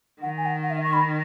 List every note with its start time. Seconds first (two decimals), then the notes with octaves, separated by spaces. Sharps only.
0.22 D#3 F#5
0.37 G#5
0.46 F#5
0.63 F#5
0.70 E5
0.84 C#6
0.93 B5